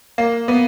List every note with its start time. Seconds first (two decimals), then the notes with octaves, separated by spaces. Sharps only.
0.18 A#3
0.48 B3